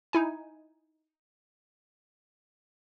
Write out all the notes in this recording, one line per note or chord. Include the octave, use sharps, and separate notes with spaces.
D#4 E4 G#5